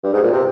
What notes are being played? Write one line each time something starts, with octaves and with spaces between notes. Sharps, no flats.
G2
G#2
A#2
C3